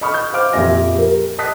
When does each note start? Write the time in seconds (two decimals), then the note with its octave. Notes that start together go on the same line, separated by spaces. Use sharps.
0.01 D#5 B5 C#6 D#6 F6
0.14 G6
0.33 C5 F5 D6 F6
0.53 F2 A#2 G4 E5 G#5 A#6
0.94 G4 A#4
1.38 D#5 A5 D#6 F#6 B6